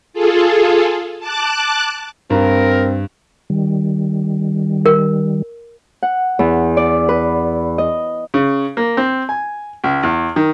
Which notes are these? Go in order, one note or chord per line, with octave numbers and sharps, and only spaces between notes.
F4 G#4 A4
A5 D6 F#6
G2 C4 A#4
D#3 G3
A#4
F#5
E2
D5
B4
D#5
C#3
A#3
C4
G#5
C#2
E2
D#3